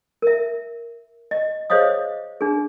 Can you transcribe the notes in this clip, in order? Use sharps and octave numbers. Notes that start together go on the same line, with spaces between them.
A#4 E5
D#5
G#4 C5 C#5 D#5 F5 D#6
D4 G#4